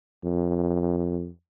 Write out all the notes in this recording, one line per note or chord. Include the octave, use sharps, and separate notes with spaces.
F2